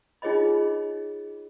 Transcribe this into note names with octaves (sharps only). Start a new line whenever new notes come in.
D#4 F4 G#4 C#5 D#5 B5